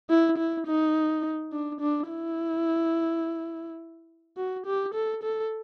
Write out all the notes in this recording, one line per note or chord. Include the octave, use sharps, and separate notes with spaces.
E4
E4
D#4
D4
D4
E4
F#4
G4
A4
A4